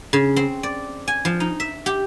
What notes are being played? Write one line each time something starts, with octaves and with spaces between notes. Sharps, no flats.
C#3
C4
D5
G#5
F3
D#4
E5
G4